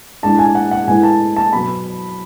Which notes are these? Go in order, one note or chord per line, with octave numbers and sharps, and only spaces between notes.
A2 G#3 D4 A5
G#5
F#5
F#5
A2 G#3 B3 E4 G#5
A5
A5
B2 F#3 B3 B5